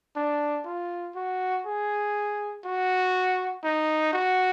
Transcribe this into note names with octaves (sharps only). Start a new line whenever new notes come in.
D4
F4
F#4
G#4
F#4
D#4
F#4